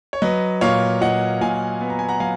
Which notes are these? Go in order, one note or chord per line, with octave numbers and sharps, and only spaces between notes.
C#5
F#3 B4 D#5
A#2 C#5 F5
A#2 D#5 F#5
A#2 F5 G#5
B3
A#5
G#5
F#5 A#5
F#3 F5 G#5